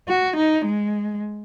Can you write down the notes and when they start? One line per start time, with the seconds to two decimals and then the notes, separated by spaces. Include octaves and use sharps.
0.08 F#4
0.37 D#4
0.65 G#3